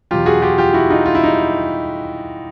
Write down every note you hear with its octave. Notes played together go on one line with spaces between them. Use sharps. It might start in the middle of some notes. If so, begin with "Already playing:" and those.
E2 B2 F#3 F4 G4
F#4 G#4
F4 G4
F4 G4
E4 F#4
D#4 F4
F4
E4
D#4